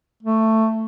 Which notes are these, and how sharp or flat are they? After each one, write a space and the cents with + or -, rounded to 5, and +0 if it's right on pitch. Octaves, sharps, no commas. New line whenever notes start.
A3 +10